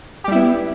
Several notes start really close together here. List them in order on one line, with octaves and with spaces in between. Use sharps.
G4 G3 E4 B3